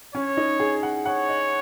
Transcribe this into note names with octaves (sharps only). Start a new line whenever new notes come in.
C#4 C#5
D#4
G#4
F#5
C#5 F#5
D#5